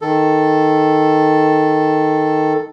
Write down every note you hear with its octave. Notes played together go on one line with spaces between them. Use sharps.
D#3 A4